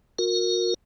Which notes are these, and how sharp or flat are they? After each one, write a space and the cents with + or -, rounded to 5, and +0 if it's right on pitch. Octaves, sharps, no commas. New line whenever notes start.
F#4 -40 A#4 -5